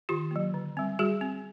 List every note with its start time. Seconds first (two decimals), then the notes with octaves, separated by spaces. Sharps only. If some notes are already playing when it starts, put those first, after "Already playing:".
0.09 D#3 F4 G4
0.31 F#3 A#3
0.54 D3
0.77 G3 C4
0.99 G3 F#4 G#4
1.21 C4